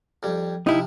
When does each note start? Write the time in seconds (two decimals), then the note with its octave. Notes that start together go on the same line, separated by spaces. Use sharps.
0.23 F2 G3
0.67 C3 F3 D#4 E4